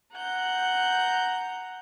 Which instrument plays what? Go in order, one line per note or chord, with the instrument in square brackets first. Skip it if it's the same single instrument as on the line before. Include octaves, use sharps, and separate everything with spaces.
[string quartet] F#5 A#5 G6